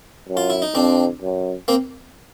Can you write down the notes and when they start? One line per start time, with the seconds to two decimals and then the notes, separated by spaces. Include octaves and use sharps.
0.29 F#2
0.37 F4
0.50 E4
0.62 D#4
0.75 F2 C4 D4
1.22 F#2
1.68 A#3 C4